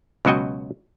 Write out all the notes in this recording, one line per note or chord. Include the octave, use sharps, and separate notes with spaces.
C#2 B2 F#3 F#4 D#5 G5